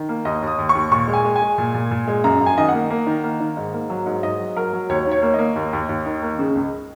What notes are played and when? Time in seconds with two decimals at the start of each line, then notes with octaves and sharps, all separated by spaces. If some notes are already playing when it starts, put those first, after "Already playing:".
Already playing: D#3
0.09 A#3
0.25 D#2 D#5
0.42 D#2
0.47 D#6
0.58 D#2
0.69 C#6
0.75 D#2
0.92 A#2 C#6
1.08 G#3
1.13 G#5
1.25 G#3
1.36 G#5
1.41 G#3
1.58 A#2
1.74 A#2
1.91 A#2
2.07 G#3
2.24 F#2 A#5
2.41 F#2
2.46 G#5
2.57 D#3 D#5
2.69 F#5
2.74 A#3
2.90 A#3
3.07 D#3
3.24 A#3
3.40 D#3
3.57 G#2
3.74 A#3
3.90 F#3
4.06 G#2
4.23 G#2 D#5
4.40 F#3
4.56 F#3 A#4
4.73 F#3
4.89 D#2 C#5
5.06 D#3
5.11 C#5
5.22 A#3
5.34 A#3 D#5
5.56 D#2
5.73 D#2
5.89 D#2
6.06 D#3
6.22 A#3
6.39 C#3
6.55 C#2